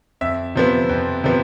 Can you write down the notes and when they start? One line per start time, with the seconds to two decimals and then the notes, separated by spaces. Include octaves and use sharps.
0.21 F2 E5
0.55 C3 F3 B3
0.89 F2
1.24 C3 F3 B3